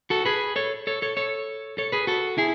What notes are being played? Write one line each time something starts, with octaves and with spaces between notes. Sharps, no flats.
F#4 A4
G#4 B4
A4 C#5
A4 C#5
A4 C#5
A4 C#5
A4 C#5
G#4 B4
F#4 A4
E4 G#4